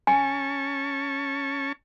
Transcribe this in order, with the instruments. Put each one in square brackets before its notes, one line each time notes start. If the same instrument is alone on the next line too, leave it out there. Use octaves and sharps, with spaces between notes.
[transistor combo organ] C#4 A5 C#6 [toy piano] G#5